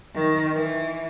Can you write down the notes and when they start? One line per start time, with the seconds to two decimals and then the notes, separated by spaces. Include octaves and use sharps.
0.15 D#3
0.55 E3